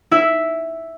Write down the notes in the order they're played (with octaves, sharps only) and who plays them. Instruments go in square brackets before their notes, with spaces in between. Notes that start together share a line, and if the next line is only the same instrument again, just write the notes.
[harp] E4 E5